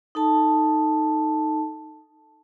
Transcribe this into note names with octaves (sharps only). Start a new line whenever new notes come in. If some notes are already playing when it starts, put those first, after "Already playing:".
D#4 A4 A5